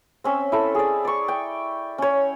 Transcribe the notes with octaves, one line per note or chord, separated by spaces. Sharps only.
C4 C#4 E5
E4 A4
G#4 D5
D5 C#6
G5
C#4 C#5